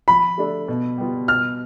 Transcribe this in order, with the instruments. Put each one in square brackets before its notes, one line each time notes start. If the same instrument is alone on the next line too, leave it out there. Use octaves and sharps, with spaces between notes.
[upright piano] F3 [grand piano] B5
[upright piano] A3 D4 A4
B2
G3 B3 F4
[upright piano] B2 [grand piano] F6